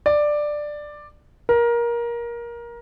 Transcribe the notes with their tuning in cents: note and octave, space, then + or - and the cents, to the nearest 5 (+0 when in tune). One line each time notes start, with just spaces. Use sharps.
D5 +10
A#4 +20